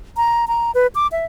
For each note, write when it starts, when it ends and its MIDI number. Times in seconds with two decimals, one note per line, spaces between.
0.17 0.45 82
0.48 0.71 82
0.75 0.87 71
0.95 1.07 86
1.12 1.25 76